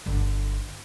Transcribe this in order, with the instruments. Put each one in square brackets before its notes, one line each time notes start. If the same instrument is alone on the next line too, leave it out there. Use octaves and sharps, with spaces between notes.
[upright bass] G1 D3